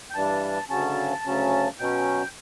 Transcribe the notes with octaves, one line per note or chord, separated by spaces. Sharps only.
G5
G2 E3 G3 D4 A5
D2 C#3 F#3 C#4 A5
D2 C#3 F#3 C#4
B2 F#3 C#4 G5